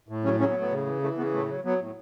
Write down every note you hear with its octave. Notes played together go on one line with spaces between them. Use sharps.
A2
C#3 F#3 C#4
C#3 F#3 C#4
B3
A2
B3
C#3
E3
E3 A3
C#3 B3
A2 A3
F#3
F#3 B3
A2